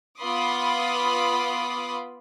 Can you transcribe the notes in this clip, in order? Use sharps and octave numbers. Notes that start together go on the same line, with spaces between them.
B3 F4 B5 C6 D6 D#6